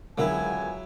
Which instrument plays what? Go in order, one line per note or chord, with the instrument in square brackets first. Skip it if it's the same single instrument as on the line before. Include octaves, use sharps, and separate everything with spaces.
[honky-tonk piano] C#2 D3 B3 [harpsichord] F#3 E4 [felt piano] A#4 F#5 [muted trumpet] G#5